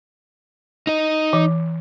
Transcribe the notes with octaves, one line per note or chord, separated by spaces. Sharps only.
D#4 D#5
E3